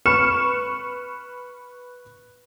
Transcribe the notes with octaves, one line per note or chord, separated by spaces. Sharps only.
B4 C#6 F6 C#7 E7